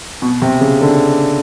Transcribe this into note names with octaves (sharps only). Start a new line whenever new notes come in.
B2
C3
C#3
D3